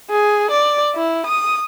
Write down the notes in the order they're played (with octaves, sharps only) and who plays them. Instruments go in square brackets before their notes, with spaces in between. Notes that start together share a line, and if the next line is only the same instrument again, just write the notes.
[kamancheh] G#4
D5
E4
D#6